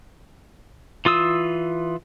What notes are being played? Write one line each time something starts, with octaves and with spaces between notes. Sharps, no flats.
E3 F4 D#6 E6